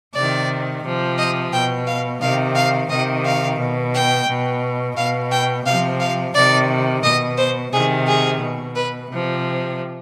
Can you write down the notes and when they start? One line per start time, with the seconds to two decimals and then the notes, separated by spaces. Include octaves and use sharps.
0.14 C3 D#3 D5
0.83 C3 F3
1.18 D#5
1.52 B2 G5
1.87 F5
2.21 C3 D#3 F5
2.55 F5
2.90 C3 D#3 D#5
3.24 F5
3.59 B2
3.93 G5
4.27 B2
4.97 B2 F5
5.31 G5
5.66 C3 F3 F5
6.00 F5
6.34 C3 D#3 D5
7.03 B2 D#5
7.38 C5
7.72 C3 D#3 G#4
8.07 G#4
8.41 B2
8.75 B4
9.11 C3 F3